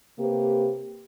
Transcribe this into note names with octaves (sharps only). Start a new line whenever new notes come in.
C3 A#3 G4 B4